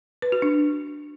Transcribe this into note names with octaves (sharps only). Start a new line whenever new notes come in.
B4
F#4
D4